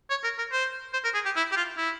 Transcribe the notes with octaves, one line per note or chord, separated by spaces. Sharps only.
C#5
A#4
A#4
C5
C5
A#4
G#4
G4
E4
G4
F4
E4